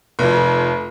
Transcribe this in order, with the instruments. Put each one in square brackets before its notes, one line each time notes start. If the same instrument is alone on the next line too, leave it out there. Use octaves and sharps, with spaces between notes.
[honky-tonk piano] F1 F2